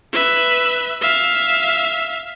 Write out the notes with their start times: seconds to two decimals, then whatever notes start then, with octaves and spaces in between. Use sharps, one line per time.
0.13 B4 E5
1.01 E5 F5